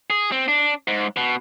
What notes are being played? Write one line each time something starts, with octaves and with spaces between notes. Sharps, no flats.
G#4
C4
D4
G#2
B2